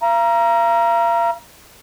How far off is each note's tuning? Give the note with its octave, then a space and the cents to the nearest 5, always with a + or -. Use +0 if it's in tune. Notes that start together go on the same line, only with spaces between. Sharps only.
F5 -40 A#5 +15